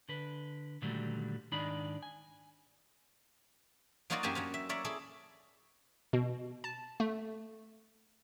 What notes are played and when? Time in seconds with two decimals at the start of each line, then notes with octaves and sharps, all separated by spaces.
0.09 D3 B4
0.82 A#2 D3 D#3 F#3 G3 A3
1.52 G#2 D#3 D4 D#4 D5 B5
2.03 G#5
4.10 F#3 A#3 D#4 F4 F#4 D5
4.23 F#2 A#3 G4 G#5 A5
4.35 F#3 C#4 F4
4.54 E5
4.69 A#4 C#5 D5 E5
4.85 E4 G#4 A4 D5
6.13 B2
6.64 A5
7.00 A3